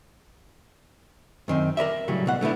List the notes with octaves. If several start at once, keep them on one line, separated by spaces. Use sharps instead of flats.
F#2 D#3 C4
A#4 B4 D5 E5
A2 C#3 F#3 G3
C2 B2 F#5
D3 A3 B3 E4